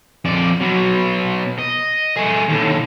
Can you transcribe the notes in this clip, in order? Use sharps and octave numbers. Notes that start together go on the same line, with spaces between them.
F2 D5
B2 F#3
D#5
A3 G#4
D#2 A2